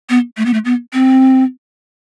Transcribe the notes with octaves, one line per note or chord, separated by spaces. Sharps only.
B3
A3
B3
A3
B3
C4